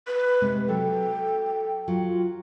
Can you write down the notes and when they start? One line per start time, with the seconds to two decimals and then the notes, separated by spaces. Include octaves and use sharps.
0.07 B4
0.41 C3 G#3
0.68 F#3 A4 G5
1.88 F#3 F4